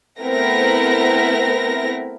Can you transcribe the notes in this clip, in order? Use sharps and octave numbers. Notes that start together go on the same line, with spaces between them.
A3 B3 C4 E4 A#4 A#6